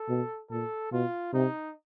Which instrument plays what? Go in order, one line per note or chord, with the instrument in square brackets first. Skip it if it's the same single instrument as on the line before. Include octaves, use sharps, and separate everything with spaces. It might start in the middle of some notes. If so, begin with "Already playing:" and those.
Already playing: [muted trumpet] A4
[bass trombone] B2
[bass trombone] A#2 [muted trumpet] A4
[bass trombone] B2 [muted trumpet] F4
[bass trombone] C3 [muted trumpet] D#4